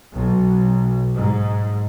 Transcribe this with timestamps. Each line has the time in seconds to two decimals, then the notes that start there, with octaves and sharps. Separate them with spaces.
0.13 B1
1.16 G#2